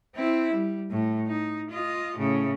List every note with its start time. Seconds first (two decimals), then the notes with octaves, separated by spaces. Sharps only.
0.15 C4 E4
0.53 G3
0.91 A2
1.27 D#4
1.70 F4 D#5
2.16 A2 C#3